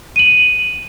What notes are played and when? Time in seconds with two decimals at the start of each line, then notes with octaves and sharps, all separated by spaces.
0.16 D#7 F#7